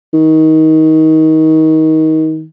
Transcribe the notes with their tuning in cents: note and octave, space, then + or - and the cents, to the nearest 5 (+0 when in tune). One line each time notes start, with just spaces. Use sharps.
D#3 +25